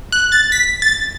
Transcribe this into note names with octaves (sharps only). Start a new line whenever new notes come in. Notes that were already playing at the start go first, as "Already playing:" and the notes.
F#6
A6
B6
A6